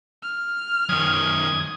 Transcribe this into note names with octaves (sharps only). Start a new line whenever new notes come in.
F6
F#2 D#3 D#6 G#6